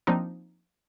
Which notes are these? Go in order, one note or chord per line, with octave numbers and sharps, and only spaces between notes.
F3 A#3 C4 D4 D#4